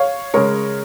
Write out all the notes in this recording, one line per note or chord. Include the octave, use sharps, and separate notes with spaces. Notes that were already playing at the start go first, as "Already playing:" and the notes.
Already playing: C#5 F5
C#3 G#3 A#4 C#5